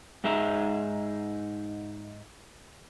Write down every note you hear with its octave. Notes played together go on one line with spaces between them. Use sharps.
G#2 D#4 G#4 E5 A#5